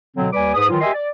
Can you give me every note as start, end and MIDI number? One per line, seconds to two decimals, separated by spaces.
0.17 0.28 47
0.17 0.28 50
0.17 0.28 54
0.17 0.28 60
0.33 0.51 39
0.33 0.51 55
0.33 0.51 71
0.33 0.51 74
0.33 0.51 80
0.33 0.51 86
0.55 0.69 44
0.55 0.69 68
0.55 0.69 71
0.55 0.69 87
0.70 0.81 51
0.70 0.81 52
0.70 0.81 54
0.70 0.81 65
0.81 0.89 67
0.81 0.89 70
0.81 0.89 75
0.81 0.89 76
0.81 0.89 80
0.81 0.89 84
0.94 1.08 74